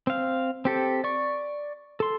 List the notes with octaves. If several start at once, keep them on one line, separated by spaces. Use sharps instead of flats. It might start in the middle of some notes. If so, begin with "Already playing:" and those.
C4 F5
C4 G4 A4
D5 C#6
A4 C6